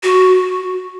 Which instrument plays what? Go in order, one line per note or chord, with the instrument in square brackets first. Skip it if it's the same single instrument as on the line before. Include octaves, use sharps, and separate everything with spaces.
[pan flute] F#4